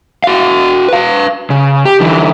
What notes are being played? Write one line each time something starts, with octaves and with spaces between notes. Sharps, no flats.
F#4 F5
B4 F5
C#3
G4
D3 E3